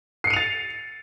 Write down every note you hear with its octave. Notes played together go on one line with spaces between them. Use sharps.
A6 C7 C#7 D#7 F7